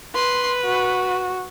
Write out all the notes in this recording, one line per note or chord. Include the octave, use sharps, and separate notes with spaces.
B4 C6
F#4